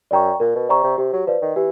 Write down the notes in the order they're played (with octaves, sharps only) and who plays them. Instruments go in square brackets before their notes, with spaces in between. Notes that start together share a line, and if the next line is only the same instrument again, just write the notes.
[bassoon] F#2 [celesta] D5 G5 A#5 C#6
[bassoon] A#2 [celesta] A#4
[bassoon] B2
[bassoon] C3 [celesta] D5 G5 A#5 C#6
[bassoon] C3
[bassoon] C3 [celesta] G4
[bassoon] F#3
[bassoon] F3 [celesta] B4 D5
[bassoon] D#3
[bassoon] E3 [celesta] G4